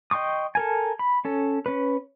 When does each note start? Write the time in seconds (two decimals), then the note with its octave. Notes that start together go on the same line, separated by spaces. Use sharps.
0.11 D#5 G5 C6 C#6 D#6
0.55 A4 A#4 G#5
0.99 B5
1.25 C#4 A4
1.66 C#4 B4